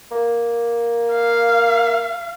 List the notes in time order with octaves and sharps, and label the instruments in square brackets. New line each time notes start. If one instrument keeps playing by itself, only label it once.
[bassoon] A#3
[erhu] F5